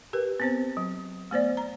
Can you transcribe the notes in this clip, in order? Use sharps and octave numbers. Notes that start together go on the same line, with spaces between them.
G4 A#4 B4
B3 C4 C5
F#3
A3 B3 C5 D5
A#5